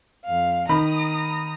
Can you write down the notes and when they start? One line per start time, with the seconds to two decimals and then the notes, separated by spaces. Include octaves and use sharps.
0.24 F2 F5
0.69 D#3 A#5 B5 D#6